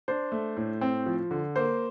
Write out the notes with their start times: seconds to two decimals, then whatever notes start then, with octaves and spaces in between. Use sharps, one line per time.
0.08 D4 C5
0.32 A3
0.57 A2
0.81 C4
1.06 F3
1.31 D3
1.56 A#3 C5